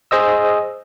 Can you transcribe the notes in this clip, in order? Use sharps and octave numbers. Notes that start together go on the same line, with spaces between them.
G#4 C5 D#5 E6